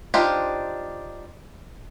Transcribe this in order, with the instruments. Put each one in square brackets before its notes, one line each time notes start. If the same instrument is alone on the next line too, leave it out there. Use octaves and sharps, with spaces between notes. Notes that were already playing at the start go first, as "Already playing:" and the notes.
[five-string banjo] D4 D#4 F4 G4 C5